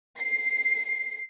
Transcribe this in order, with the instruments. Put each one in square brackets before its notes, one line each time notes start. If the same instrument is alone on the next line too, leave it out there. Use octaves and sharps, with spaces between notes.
[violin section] C7